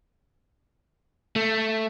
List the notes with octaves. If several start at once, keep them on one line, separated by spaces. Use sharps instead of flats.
A3